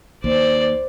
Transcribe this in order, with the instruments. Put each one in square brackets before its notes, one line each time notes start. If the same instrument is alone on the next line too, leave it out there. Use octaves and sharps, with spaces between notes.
[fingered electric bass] D#2 [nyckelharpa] C5 D5